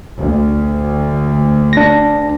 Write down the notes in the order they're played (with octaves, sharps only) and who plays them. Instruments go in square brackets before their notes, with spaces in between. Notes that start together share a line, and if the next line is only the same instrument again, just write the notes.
[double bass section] D2
[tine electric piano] D4 A#6